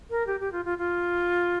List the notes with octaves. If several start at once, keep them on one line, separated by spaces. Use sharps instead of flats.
A#4
G4
G4
F4
F4
F4